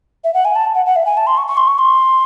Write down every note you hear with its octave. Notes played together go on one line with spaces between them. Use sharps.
E5
F#5
G#5
A5
F#5
F#5
E5
G#5
A5
C6
C#6
C#6
C6
C#6
C6